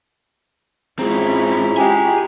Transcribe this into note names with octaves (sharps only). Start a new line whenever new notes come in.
G#2 C4 C#4 E4 F4 G#4 A#5
G#3 G4 G#5